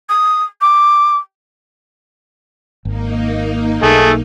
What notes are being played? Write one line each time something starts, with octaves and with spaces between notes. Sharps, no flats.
D#6
D6
G#1 A#3 D#4
B1 A3 G#4 A4